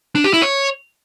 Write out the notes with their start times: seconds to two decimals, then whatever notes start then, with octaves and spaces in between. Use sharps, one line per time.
0.15 D4
0.24 G4
0.33 E4
0.42 C#5